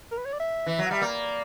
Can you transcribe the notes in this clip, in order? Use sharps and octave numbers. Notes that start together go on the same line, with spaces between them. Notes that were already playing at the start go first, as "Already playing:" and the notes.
A#4
B4
C#5
D5
E5
E3
F#3
F#5
G3 E5
A#3 D5